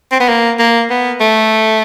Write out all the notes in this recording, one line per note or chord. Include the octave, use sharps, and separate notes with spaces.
C4
B3
A#3
A#3
B3
A3